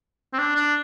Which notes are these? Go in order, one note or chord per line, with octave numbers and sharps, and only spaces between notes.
C4
D4
D4